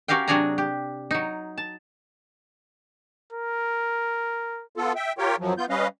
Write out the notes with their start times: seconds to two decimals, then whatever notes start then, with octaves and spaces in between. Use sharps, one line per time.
0.08 C#4 F#4 G4 A#4 F5 G5
0.28 C3 F#3 D4 G#4 G#5 A#5
0.58 G4
1.11 F#3 D#4
1.58 A5
3.33 A#4
4.75 B3 F4 A4
4.96 E5 G5
5.18 F4 G4 A#4 C#5 G5
5.39 F#2 F3 F#3
5.58 B3 F4 G6
5.70 G3 C#4 B4 D#5 F5